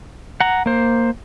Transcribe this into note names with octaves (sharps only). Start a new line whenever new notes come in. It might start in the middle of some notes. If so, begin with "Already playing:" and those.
F#5 A#5
A#3 C5